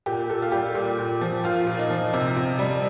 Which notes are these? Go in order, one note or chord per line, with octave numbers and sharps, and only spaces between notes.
A#2 G4
A#2 A4
F4
G3 G4
A#2
A#2
F3
A#2 F4
A#2
D#4
F3
C3
C3
G3